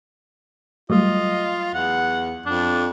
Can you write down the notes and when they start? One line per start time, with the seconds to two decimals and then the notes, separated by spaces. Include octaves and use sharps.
0.90 F#3 G3 A3 F4 D#5
1.74 E2 F#5
2.46 F2 D4